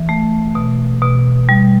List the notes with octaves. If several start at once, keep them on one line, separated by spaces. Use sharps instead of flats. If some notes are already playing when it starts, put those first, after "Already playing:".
Already playing: E3
A3
B2
B2
G3